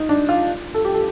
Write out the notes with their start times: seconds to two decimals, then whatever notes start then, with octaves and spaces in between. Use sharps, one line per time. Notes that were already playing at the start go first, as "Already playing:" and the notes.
Already playing: D#4
0.09 D4
0.29 F4
0.74 A4
0.85 G4
0.94 A4